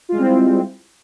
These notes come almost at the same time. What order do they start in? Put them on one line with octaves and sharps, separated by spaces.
F4 G#3 G3 C4 E4